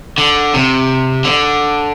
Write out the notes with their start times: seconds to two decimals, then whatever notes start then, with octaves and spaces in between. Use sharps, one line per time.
0.18 D3
0.54 C3
1.24 D3